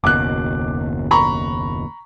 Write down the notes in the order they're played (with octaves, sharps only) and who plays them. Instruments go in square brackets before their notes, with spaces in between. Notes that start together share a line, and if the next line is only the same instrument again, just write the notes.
[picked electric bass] F#1 D#2 B2 [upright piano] D6 F#6
[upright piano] A#5 B5 C#6